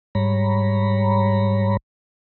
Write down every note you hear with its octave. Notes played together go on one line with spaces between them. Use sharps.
G#2 G3 C#5 A#5 B5